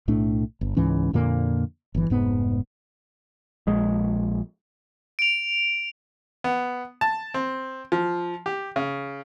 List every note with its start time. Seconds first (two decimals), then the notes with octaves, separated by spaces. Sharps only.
0.08 B1 A2 A3 D4
0.61 G1
0.77 C#2 G#2 E3 C#4
1.13 F2 A#2 D3 A#3
1.95 G1 E3
2.10 F1 G#2 B3
3.67 A#1 G#3
5.19 D7 F7
6.44 B3
7.01 A5
7.34 C4
7.92 F3
8.46 G4
8.76 C#3